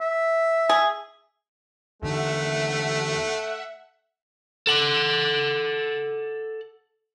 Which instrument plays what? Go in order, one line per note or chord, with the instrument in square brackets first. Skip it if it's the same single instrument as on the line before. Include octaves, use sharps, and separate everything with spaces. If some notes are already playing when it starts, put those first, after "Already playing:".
[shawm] E5
[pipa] G#4
[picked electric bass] E2 D3 D#3 [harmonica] A3 [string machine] E5 F#5
[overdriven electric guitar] A4 F#5